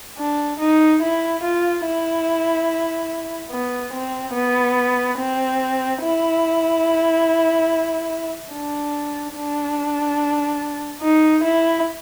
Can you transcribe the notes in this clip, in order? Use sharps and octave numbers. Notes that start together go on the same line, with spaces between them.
D4
D#4
E4
F4
E4
B3
C4
B3
C4
E4
D4
D4
D#4
E4